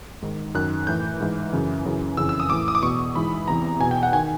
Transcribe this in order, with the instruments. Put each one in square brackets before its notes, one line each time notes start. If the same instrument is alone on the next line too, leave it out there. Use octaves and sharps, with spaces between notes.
[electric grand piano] G#2 D#3
F#2 D#3 F#6
A2 E3 G6
G#2 E3
F#2 C#3 E3
F#2 C#3 E3
F2 C#3 E3 E6
E6
D#6
A2 E3 D6
D#6
D6
E2 B2 C#6
G#2 E3 B5
E2 C3 E3 A#5
E2 B2 G#5
G5
F#5
D#3 G#5